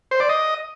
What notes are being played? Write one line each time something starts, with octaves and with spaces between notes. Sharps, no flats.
C5
D5
D#5